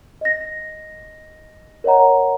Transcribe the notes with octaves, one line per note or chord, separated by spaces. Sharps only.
D#5 A#6
A#4 C#5 D#5 F#5 A#5